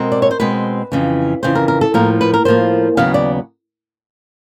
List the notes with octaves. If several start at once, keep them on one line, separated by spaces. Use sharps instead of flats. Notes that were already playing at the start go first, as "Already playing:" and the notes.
Already playing: B2 G#3 C4 A#4
D5
C#5
C5
B2 G#3 C4 B4
F2 C#3 E3
F2 C#3 E3 C5
A#4
A#4
A4
A2 F3 A#3 A#4
B4
A#4
A2 F3 A#3 C5
D#2 C#3 F#3 B3 F5
D5